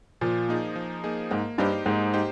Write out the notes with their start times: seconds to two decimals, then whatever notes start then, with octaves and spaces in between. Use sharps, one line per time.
0.21 A#2 F3
0.49 A#3 D#4 G#4
0.76 F3
1.04 A#3 D#4 G#4
1.31 G#2 A#3
1.58 G2 D#4 G4 C5
1.86 G#2 A#3
2.14 D#4 G4 C5